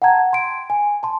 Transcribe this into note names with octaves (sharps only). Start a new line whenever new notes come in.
F#5 G5 A5 A#5 G#6
C6 D7
G#5
A5 C6